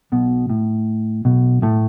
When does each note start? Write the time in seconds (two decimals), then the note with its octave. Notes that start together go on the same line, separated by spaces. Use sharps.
0.12 B1 B2
0.50 A2
1.25 B1 B2
1.62 A2 A3